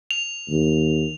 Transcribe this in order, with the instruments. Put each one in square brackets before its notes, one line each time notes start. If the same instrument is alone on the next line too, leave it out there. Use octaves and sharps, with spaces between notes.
[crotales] F7
[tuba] D#2